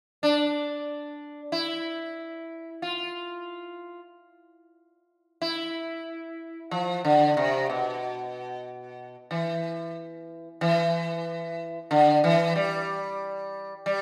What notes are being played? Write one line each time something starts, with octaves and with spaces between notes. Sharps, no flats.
D4
E4
F4
E4
F3
D3
C3
B2
E3
E3
D3
E3
G3
G3